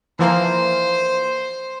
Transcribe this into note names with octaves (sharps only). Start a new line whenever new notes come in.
E3 F3 A#3 C5